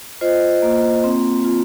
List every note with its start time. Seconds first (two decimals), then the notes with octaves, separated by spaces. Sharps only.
0.21 F4 C5 D#5
0.62 A#3
1.04 C4
1.45 F4